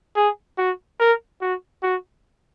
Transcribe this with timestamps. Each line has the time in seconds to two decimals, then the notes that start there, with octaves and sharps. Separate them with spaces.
0.16 G#4
0.58 F#4
1.00 A#4
1.41 F#4
1.83 F#4